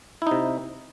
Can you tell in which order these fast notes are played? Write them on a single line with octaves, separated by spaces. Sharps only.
E4 D#4 C3